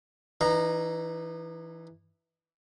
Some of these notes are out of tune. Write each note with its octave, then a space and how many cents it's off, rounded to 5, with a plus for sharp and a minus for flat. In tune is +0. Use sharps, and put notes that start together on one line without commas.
E3 +0 D#4 -35 A#5 +0